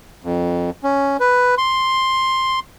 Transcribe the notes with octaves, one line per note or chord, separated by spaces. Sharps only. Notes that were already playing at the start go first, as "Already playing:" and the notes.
F2
C#4
B4
C6